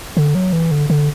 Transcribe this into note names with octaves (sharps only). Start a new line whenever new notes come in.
D3
F#3
E3
D3
D3